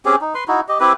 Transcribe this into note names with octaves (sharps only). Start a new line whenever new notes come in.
C4 C#4 G4 G#4
D#4
B4 C6
D#4 E4 F#4
G4 D#5
C4 E4 G4 B4